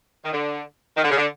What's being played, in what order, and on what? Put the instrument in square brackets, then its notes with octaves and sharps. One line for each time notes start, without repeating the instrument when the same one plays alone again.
[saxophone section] D#3
D3
D#3
D3
C#3
D3